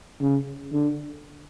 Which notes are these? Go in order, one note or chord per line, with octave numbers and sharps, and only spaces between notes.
C#3
D3